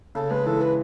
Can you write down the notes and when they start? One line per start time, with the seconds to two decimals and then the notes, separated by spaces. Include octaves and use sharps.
0.15 C#3 A4
0.31 G#3 B4
0.46 E3 A4
0.61 B4